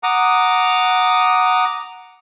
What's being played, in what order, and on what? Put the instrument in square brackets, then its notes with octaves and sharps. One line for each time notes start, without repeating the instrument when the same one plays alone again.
[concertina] F#5 A#5 D6 D#6